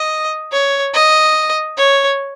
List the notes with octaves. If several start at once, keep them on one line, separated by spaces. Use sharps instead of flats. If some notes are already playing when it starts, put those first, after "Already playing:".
Already playing: D#5
C#5
D#5
C#5